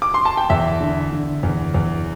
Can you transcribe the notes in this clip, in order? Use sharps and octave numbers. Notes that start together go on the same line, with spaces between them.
D6
C6
A5
G5
E2 E5
D3
D3
E2
E2